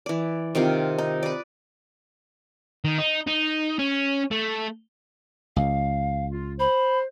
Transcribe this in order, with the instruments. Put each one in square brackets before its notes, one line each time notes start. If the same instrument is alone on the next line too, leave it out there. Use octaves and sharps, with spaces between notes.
[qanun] E3 D5
C3 D#3 C4 F4
D#4
B4 D5
[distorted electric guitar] D#3
D#4
D#4
C#4
A3
[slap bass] C#2 [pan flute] F5
[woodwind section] F4
[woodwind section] C5 [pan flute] B5